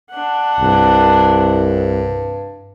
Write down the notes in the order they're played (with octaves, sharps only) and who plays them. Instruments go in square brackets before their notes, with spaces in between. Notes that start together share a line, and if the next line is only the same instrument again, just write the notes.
[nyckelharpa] D4 F#5
[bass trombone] C2 [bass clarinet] G2